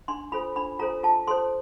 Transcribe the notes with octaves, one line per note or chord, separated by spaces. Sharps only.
D4 C6
F4 A4 C5 B5
D4 B5
F4 A4 C5 A#5
F4 A5
A4 C5 C6